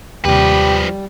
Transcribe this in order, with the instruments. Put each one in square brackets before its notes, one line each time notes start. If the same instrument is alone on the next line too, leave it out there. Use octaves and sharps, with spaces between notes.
[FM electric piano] D#2 C3 [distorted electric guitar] F3 B4 [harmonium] G3 [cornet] G4